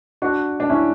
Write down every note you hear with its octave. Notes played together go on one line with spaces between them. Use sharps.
D4 F#4
D4
C#4 E4